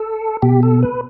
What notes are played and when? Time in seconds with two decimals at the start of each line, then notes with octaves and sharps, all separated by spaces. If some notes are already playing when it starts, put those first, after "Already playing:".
Already playing: A4
0.42 B2 G4
0.63 A4
0.83 B4